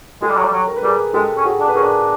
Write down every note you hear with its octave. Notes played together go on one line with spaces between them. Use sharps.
G#3 G4 A4
G3
F#3
G3
F#3
A#4
B4
G3 G#4 A#4
G#3 G4 A4
C#4
F#4 G#4
D4
B4
C#4 G#4 A#4
D4